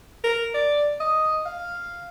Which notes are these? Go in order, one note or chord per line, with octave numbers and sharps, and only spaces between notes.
A#4
D5
D#5
F5